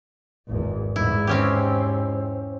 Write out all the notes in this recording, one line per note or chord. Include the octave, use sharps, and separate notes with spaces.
G#1 E2
E2 G#2 E4
C4 C#4 G4